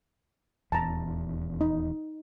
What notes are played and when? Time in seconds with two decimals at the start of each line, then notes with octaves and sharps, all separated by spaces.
0.72 D#1 E2 A5 A#5
1.61 D#4